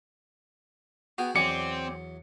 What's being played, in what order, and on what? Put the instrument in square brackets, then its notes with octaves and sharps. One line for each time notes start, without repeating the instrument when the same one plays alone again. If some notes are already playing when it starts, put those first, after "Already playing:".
[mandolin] B3 [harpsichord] F#4 G#4 G5
[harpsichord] E2 F#3 [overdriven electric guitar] C4 [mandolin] D5 G#5 [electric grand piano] C#7